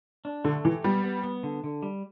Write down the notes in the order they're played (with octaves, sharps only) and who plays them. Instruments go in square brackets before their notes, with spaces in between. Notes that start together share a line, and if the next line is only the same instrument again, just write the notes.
[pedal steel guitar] D4
[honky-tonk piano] D3 [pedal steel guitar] A3
[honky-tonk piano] E3 [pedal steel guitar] G4
[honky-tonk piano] G3 [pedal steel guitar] B3
[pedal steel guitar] B3
B3
D3
D3
G3